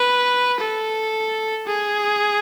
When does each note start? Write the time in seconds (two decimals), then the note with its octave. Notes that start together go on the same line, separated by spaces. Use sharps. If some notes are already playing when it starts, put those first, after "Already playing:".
Already playing: B4
0.61 A4
1.67 G#4